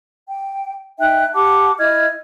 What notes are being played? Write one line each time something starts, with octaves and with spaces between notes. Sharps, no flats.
G5
D#4 E5 G5 F#6
G4 F#5 A5 D6
E4 D#5 F6 G#6